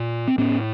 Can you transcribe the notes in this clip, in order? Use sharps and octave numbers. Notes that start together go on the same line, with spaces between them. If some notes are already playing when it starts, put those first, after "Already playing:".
Already playing: A#2
C4
A2 B3 C#4